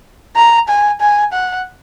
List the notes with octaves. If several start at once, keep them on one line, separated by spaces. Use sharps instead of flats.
A#5
G#5
G#5
F#5